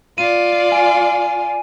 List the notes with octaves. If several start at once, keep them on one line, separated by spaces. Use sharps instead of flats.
F4 D5 D#7
G#5